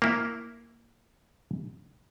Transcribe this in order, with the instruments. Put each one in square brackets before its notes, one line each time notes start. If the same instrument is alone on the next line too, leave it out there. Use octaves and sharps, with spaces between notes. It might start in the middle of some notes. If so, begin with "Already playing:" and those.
[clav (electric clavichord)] A#3 E4